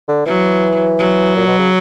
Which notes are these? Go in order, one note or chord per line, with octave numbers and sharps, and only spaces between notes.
D3
E3 F#3
F#3
A#2
B2
C#3